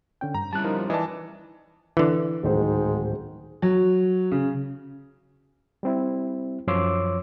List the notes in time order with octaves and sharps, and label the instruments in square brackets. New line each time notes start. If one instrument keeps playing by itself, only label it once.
[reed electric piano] D3 C#4 G5
[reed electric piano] G2 [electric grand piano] A#5
[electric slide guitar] G3 C#4 E4 [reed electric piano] A5 F#6
[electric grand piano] F3 [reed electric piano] D#4 A#4
[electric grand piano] E3 A5 [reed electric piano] D5 D#5
[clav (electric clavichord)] D3 E3
[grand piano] D1 D#3 C5 [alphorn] G#2
[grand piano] F#3
C#3
[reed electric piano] G3 C4 E4
F#2 F3 C#5 C6 D6 E6